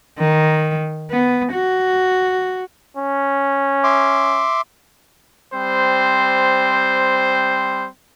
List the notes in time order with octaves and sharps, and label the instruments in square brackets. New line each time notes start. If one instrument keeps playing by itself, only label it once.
[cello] D#3
B3
F#4
[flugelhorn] C#4
[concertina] E5 C6 D6
[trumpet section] G3 C4 C5